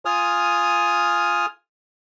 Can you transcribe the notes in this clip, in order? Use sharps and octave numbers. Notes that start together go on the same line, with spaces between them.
F4 G#5 D#6 F6